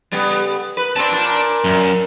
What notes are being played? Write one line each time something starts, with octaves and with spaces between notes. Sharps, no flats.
C#3 G3 B3
B4
C4 D5 A5
A#2
F#2